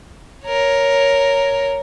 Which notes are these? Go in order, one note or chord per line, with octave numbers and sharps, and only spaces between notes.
A#4 C#5